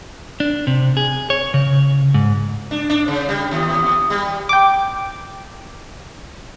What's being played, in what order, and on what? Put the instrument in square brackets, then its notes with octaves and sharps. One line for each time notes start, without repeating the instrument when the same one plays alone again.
[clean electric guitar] D4
C3
G#4
C#5
C#3
G#2
[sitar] D4
D4
C#3
G3
D#2
G3
[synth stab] G5 D6